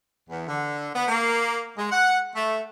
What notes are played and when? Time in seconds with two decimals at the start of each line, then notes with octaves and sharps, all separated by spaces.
0.28 E2
0.46 D3
0.93 B3
1.08 A#3
1.77 G#3
1.91 F#5
2.33 A3